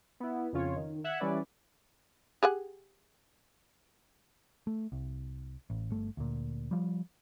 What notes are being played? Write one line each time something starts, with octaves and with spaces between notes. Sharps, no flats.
B3 E4
F2 C#3 C#4 F4 C#5
D#3
E5 F#5 F#6 G#6
E3 G3 C#4 B4 D5
G4 G#4 F#5
A3
C2
A1
G1 A3
D2 A#2
F3 G3